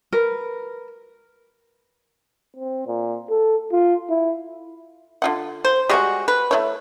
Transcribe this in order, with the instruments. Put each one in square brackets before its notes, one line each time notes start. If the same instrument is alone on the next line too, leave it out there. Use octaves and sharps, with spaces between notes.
[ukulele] A#4 B4
[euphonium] C4
A#2
A4
F4
E4
[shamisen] D3 F4 F#5
[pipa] C5
[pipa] G3 G#3 F#4 [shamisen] G4 F#5
[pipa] B4
[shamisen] A3 E4 C#5